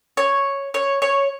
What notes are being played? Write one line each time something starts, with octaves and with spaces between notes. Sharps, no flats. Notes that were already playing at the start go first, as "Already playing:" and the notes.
C#5
C#5
C#5